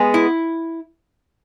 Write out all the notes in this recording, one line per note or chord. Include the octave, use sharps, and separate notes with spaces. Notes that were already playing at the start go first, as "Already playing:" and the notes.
Already playing: G#3 B3 G#4
E4